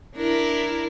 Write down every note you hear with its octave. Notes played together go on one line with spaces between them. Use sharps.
D4 E4 A#4